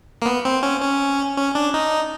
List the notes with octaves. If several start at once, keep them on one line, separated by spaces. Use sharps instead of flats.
A#3
B3
C4
C#4
C#4
C#4
D4
D#4